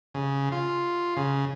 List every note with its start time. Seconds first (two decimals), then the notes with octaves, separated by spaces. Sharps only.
0.14 C#3
0.52 F4
1.17 C#3